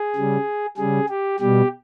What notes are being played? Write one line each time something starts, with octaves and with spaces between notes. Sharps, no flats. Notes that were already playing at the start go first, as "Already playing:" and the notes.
Already playing: G#4
C#3 G3
C#3 G3 G#4
G4
B2 G3 G4